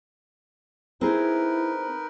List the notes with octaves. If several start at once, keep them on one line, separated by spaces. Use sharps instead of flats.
C4 D#4 E4 G#4 A#4 B4